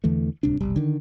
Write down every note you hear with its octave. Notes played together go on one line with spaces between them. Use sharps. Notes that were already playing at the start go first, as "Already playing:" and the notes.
E2 D3 E3 A3
D1 C2 C3 D4
F1 B1 G3
D3 D#3